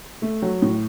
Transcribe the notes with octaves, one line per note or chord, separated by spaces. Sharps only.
A3
F#3
A2